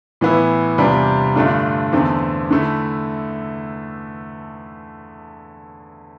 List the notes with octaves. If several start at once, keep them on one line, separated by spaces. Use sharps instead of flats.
A2 E3 B3 E4
E2 C3 G3 D4 F4
G2 D3 A3 D4 F4
E2 D3 A3 C4
D3 A3 E4